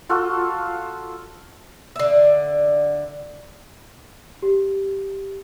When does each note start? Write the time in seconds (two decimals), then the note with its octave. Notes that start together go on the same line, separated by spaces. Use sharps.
0.09 F4 F#4 A4
1.96 D3 E5
4.42 G4